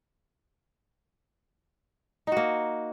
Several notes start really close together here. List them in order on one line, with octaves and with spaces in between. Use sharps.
D#4 F#4 A#3